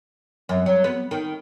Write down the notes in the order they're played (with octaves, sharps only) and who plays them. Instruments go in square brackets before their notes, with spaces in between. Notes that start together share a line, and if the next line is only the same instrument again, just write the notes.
[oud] F#2
F#3
B3
D#3